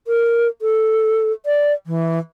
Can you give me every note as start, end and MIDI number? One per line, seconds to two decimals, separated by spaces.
0.07 0.48 70
0.61 1.32 69
1.46 1.72 74
1.86 2.18 52